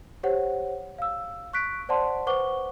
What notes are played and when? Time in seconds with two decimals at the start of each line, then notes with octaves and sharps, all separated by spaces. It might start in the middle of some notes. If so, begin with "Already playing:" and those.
0.23 G4 C5 C#5 F#5
0.98 F5 E6
1.53 C#6 F#6 B6 D7
1.89 C5 D5 F#5 A5 C6
2.27 B4 C5 F#5 C#6 D6 G7